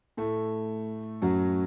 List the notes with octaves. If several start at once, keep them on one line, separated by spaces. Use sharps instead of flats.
A2 A3
F#2 F#3